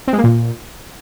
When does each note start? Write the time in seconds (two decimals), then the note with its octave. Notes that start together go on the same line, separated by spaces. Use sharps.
0.08 C4
0.13 G#3
0.18 A#3
0.24 A#2